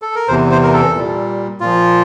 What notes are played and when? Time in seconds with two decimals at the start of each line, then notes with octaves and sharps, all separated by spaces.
0.02 A4
0.15 A#4
0.28 E2 C3 E3 C5
0.51 C5
0.63 A#4
0.73 A4
0.95 A#2 G3
1.60 A#2 F3 F4